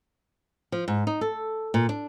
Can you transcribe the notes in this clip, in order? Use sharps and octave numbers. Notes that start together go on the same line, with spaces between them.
F3
G#2
D#4
A4
A#2
D4